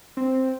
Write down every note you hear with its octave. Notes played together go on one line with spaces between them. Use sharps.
C4